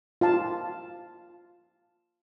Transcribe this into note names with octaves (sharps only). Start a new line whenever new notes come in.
F4 F5 A5